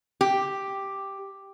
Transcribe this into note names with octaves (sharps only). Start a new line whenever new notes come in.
G4